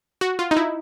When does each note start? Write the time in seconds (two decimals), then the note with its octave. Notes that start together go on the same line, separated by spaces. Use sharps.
0.21 F#4
0.39 F4
0.51 D#4
0.57 E4